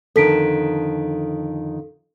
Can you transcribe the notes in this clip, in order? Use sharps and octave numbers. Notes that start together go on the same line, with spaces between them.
F2 D3 D#3 A4 B6 D7